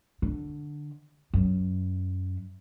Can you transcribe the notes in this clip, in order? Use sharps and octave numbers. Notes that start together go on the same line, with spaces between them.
D3
F#2